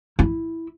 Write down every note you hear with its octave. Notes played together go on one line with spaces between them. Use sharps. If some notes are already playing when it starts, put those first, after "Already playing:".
E4